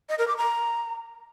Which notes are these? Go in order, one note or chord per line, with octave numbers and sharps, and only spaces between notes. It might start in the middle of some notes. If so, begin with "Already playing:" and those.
D#5
A#4
D6
A#5